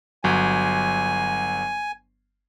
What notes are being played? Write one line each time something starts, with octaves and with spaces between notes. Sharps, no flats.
G1 F#3 G#5